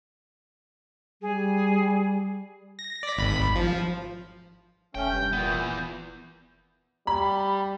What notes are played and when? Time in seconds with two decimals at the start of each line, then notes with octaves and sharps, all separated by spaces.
1.22 G3 G#4
2.79 A#6
3.03 D5 B6
3.17 G#1 B5
3.56 F3
4.95 F1 A3 C#4 G5
5.09 G2 G6
5.33 A#2 E3 B3
7.07 G3 B5